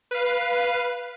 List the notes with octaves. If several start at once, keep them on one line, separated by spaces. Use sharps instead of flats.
B4 F5